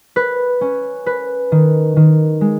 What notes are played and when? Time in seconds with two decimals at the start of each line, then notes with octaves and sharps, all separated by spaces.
0.16 B4
0.61 C#4
1.06 B4
1.52 D#3
1.97 D#3
2.41 G#3